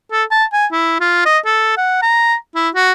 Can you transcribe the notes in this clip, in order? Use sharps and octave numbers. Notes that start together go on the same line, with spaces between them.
A4
A5
G#5
E4
F4
D#5
A4
F#5
A#5
E4
F#4